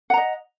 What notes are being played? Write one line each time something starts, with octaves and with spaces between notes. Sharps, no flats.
D#5 F#5 A#5